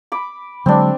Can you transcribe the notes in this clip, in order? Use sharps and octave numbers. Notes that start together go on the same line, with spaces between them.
B5 D6
D3 F#3 G#3 C4 D4